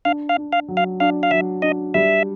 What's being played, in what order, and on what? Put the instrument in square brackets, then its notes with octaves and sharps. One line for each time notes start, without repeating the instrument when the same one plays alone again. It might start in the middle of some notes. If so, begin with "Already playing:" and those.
[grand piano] D4 [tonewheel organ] F5
[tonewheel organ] F5
[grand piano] D4
[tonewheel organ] F5
[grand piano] F#3
[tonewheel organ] F5
[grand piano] D4 [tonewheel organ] F5
[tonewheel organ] F5
[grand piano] F#3 [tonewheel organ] E5
[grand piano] D4 [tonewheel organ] D#5
[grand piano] G3 [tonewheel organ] E5